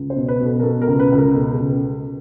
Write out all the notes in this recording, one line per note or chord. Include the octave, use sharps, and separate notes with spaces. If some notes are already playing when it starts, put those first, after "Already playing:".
Already playing: C#2
C5
B2
B4
B2
A4
A#4
B2 A4
A#4
C#2
B4
C#2
A#4
B2 A4
G#4
C#2
A4